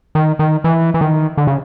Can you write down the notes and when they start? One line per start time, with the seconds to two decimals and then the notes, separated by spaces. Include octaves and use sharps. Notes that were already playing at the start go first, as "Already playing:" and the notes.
0.15 D#3
0.39 D#3
0.64 E3
0.94 E3
1.01 D#3
1.37 D3
1.47 C#3